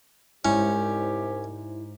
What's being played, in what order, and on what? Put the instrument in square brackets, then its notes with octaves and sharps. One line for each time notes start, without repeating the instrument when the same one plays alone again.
[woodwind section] C2 G4 [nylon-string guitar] G#2 [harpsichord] C#4 [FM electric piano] E4